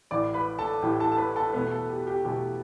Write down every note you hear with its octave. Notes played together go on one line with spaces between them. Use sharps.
A1 A2 E3 D5 D6
B4 B5
A4 A5
A1 A2 E3 G4 G5
A4 A5
A5
B4 B5
A4 A5
E2 B2 A3 B3 B4
A4
G4
G4
E2 B2 A3 G4